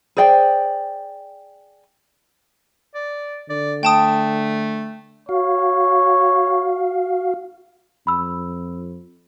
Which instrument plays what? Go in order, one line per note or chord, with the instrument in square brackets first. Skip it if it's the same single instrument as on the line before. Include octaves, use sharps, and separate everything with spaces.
[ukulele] G#4 C5 D5 G5
[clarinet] D5
[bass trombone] D3 [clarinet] D5
[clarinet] A3 [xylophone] G5 A5 D#6
[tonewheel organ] F#4 F5 [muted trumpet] C#5
[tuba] F2 [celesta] B5 E6